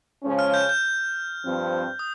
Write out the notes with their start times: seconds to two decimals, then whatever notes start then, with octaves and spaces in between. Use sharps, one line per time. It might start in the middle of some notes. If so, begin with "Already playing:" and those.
0.23 C#3 F3 G#3 C#4
0.39 F6
0.54 G6
0.69 G6
1.45 G2 F3 C4
1.99 D#6